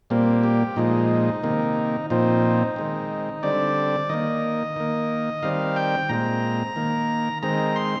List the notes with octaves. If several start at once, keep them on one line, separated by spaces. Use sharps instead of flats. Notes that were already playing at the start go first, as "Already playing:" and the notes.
A#2 G3 A#3 C4
G4
A#2 F3 G#3 D#4
C3 D#3 A#3
A#2 F3 C4 D#4
D#3 G#3 C4
D3 G3 C4 D5
D#3 A#3 D#5
D#3 A#3
D#3 G3 C4 F5
G5
A#2 G#3 C4 A#5
D#3 A#3
D#3 G#3 C4 A#5
C6